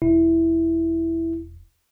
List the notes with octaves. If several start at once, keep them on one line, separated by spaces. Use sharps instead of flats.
E1 E4